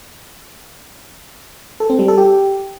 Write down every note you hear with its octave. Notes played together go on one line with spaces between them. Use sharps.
A4
C4
G3
A4
G4